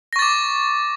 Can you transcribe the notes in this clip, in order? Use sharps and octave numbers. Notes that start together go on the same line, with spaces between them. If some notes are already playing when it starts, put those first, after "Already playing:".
C#6 D6 A6 A#6